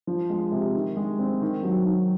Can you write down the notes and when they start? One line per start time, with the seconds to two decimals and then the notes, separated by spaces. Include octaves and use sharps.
0.07 F3
0.30 G#3
0.52 C3
0.75 D#3
0.97 G#3
1.19 C4
1.42 D#3
1.63 F#3
1.86 D#3